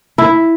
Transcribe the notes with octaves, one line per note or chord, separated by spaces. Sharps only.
E4